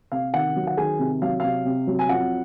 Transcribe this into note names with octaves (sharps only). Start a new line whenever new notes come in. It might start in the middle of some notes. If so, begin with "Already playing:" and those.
C3 F5
D#3 F#5
F#3
F#5
D#3 G#4 G#5
C3
F#3 F5
C3 F5
C3
F#3
G#5
F2 F#5